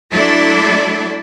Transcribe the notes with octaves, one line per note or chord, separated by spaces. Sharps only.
F#3 A3 D4 E4 A4 D5